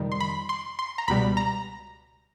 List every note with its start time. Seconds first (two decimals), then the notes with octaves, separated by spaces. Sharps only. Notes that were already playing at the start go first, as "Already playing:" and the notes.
Already playing: F2 C3 D#3 G3
0.12 C6
0.20 B5
0.49 C6
0.79 C6
0.98 A#5
1.08 C#2 B2 G3 B5
1.37 A#5